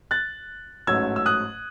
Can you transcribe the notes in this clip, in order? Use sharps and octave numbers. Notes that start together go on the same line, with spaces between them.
F#6 A6
A1 G#2 F#3 A3 C#4 E6 G#6
E6
D#6 F#6